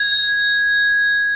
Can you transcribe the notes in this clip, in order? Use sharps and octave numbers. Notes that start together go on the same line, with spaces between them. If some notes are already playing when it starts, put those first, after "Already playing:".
Already playing: G#6